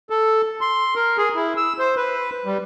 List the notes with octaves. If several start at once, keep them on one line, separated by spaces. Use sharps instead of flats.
A4
C6
A#4
G#4
E4
E6
C5
B4
G3